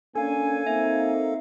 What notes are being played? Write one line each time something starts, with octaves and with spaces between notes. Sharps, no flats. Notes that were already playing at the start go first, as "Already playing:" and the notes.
A#3 C#4 D4 A4 F5 G#5
A#3 C4 D#4 E5